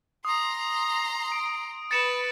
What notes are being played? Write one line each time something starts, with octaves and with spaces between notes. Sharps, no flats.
A#5 C6 D#6
D7
B4 A6 C#7 E7